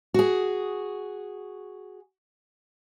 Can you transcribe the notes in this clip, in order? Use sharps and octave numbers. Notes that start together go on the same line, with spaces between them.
F#4 G#4